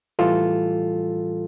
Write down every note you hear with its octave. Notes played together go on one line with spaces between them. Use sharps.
A2 E3 G3 F4 A4